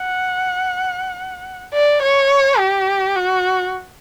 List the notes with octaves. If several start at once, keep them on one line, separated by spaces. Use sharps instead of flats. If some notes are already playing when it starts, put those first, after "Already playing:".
Already playing: F#5
D5
C#5
G4
F#4